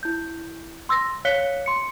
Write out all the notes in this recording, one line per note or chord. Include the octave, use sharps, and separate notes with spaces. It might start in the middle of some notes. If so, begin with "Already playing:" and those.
E4 G6
C6 E6 A6 A#6
C#5 F5 F#6 B6 C#7 G7
C6 C#7